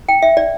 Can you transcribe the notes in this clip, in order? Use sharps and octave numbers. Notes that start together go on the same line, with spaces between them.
G5
E5
D5